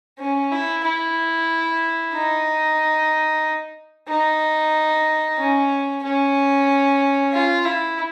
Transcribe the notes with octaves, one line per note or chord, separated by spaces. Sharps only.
C#4
E4
E4
D#4
D#4
C#4
C#4
F4
E4